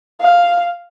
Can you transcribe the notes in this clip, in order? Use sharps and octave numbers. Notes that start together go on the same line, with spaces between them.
F5